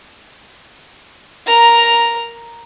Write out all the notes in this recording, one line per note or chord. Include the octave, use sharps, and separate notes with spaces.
A#4 A#5